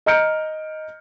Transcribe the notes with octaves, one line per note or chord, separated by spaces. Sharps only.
D#5 A#5 F6 G6 C#7 D7